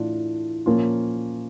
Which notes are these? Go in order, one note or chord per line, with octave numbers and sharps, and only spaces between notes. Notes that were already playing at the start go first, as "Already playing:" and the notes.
Already playing: A2 E3 A3 D4 F4
A#2 F3 A#3 C#4 F4